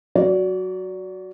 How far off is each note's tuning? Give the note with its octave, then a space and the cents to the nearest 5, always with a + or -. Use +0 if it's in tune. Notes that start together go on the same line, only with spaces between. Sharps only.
F#3 +0 D5 -30